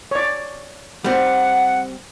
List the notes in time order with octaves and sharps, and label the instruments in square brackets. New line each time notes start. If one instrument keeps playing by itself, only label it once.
[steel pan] C#5 D5
[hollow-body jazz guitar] G3 C4 [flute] F#5